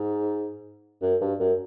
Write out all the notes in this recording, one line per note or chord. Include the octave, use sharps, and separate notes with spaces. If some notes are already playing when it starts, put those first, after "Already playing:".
Already playing: G#2
F#2
G2
F#2